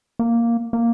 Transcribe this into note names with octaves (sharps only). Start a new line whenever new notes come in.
A#3
A#3